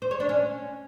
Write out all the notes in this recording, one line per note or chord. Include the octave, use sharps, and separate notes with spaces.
C5
C#5
D4
C#4